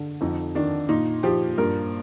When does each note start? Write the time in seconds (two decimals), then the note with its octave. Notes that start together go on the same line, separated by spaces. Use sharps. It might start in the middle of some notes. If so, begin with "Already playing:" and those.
Already playing: D3
0.21 F2 D#4
0.55 D#3 D4
0.89 A#2 D#4
1.23 F3 G4
1.58 G2 A#4